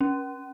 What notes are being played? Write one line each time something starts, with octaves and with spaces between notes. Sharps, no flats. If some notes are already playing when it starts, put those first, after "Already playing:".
C#4